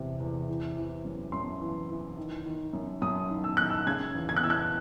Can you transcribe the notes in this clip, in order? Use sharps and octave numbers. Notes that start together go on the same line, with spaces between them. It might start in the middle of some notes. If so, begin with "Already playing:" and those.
Already playing: E2 C3
E2
E3
E3
F#2
F#2 C6
E3
E3
D#3
D#3
F#2
F#2 D#6
D#3
E6
D#3 F#6
E6
C#3 G#6
E2
G#6
F#6
E3 E6
F#6